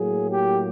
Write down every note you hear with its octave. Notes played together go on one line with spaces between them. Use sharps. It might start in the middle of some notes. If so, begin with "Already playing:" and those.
Already playing: A2 F#3 A#3 G#4
G4